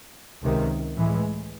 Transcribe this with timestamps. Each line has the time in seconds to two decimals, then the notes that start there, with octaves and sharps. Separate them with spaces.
0.42 C#2 C3 D#3
0.96 A2 E3 G#3